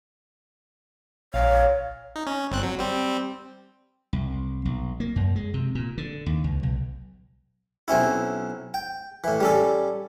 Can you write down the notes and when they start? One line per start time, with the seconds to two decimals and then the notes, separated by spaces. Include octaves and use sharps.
1.34 A#1 A#2 C#5 F5
2.16 D#4
2.27 C#4
2.52 G1 C4 F#6
2.63 F#3
2.79 G3 C4
4.13 C2
4.65 B1
5.00 A#3
5.16 F#2
5.36 G#3
5.54 C3
5.75 A#2
5.98 D3
6.26 D#2
6.44 C#2
6.63 B1
7.88 B1 C4 C#4 E4
8.74 G5
9.24 A2 E3
9.40 G3 C#4 A4